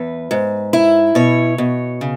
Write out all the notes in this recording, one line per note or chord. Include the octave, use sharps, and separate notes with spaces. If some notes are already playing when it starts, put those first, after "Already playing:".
Already playing: E2 B4
G#2
E4
B2 C#5
B2
C#3